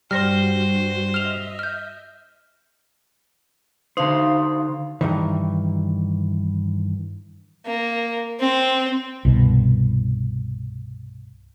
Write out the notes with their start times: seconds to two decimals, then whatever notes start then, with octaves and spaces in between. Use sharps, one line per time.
0.11 G2 G3 F#4 C5 F6 A#6
1.14 D#5 E5 F6 F7
1.59 F6 G6
3.97 D3 D#4 C5 F5
5.01 G2 D#3 E3
7.66 A#3
8.40 C4
9.25 C2 G2 B2